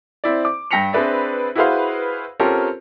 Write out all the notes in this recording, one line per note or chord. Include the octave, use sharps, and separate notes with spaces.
C4 E4 D5
D6
G2 G5 A#6 B6 C#7 F7
C4 D4 G#4 B4 D5 E5
E4 F#4 G#4 B4 C5 F5
C4 C#4 F4 G4 A4 A#4